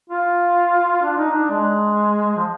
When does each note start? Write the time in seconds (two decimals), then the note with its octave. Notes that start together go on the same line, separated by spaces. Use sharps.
0.10 F4
1.03 D4
1.18 D#4
1.32 D4
1.50 G#3
2.36 F3